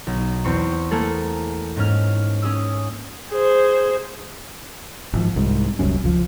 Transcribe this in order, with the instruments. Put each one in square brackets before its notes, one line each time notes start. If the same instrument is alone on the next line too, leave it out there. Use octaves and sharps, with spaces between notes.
[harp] B1
E2 C4 C6 C#6
A3 A#3 G#4 A4
G#2 C#4 F6
C#4 G#4 D#6 E6
[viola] G#4 C5
[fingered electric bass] G#1 F3
C2 G#2
D#1 C2 F#2 C#4
C#2 F3